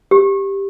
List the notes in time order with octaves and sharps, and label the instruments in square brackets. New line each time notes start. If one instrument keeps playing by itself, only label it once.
[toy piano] G4